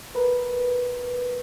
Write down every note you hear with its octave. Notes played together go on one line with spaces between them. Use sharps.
A#4 B4